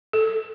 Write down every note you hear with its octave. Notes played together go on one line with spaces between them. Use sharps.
A4